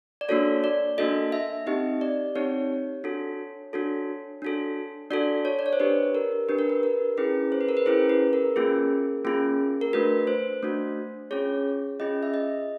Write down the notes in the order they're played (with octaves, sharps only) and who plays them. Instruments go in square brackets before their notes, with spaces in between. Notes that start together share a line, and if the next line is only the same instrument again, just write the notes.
[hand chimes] D5
A#3 D4 F#4 A4 C#5
D5
A#3 D4 F#4 A4 D#5
E5
C4 D#4 G4 D#5
D5
C4 D#4 G4 C#5
D4 F#4 A4
D4 F#4 A4
D4 F#4 A4
D4 F#4 A4 D5
C#5
D5
C#5
C5
D4 G4 B4
A#4
D4 G4 B4
A#4
B4
A#4
C#4 E4 G#4 B4
C5
B4
A#4
B4
C#4 E4 G#4 C5
B4
A#4
A#3 C#4 F4 G#4
A#3 C#4 F4 G#4
A#4
A3 D4 F#4 B4
C5
A3 D4 F#4
C#4 F4 G#4 C#5
C#4 F4 G#4 D#5
E5
D#5